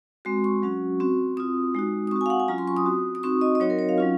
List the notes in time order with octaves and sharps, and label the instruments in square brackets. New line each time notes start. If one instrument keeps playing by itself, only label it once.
[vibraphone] G#3 C4 F#4 C6
C#6
F#3 C#4 F#4
C4 F#4
C4 F4 D#6
G#3 D#4 F#4
D#6
C4 F#4 C#6
G#5
F5
F#5
G#5
F#3 C#4 F4 A#5
C6
C#6
D#6
C4 F#4
D#6
C4 D#4 F#4 C#6
D#5
D#5
F#3 C4 D#4 F#4 C#5
A#4
C#5
F5
F#3 C#4 F4